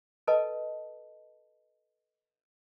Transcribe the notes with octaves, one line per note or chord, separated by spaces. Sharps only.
A4 B4 D#5 A5